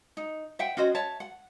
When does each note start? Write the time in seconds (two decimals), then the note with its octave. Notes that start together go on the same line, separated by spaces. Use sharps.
0.17 D#4
0.59 C5 E5 F#5 G5
0.77 C#4 F#4 C5 D#5
0.95 C#5 E5 A5
1.20 F#5